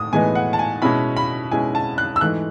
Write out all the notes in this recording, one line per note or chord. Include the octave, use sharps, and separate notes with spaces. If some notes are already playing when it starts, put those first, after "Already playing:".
Already playing: A2 D#6
A2 E3 G#3 B3 D#4 G#5
F#5
A5
G#5
B2 G#3 C#4 E4 B5
B5
B2 G#3 C#4 E4 G#5
A5
F#6
E6
G#2 E3 A3 D#4 F#6